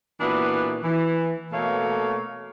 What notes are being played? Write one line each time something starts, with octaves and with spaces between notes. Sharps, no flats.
A#2 E3 B3 D4 E4 F#4
E3
B2 A3 A#3 A4 C#5 F5